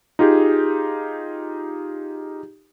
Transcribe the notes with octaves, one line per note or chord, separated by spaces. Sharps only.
D#4 F4 G4 G#4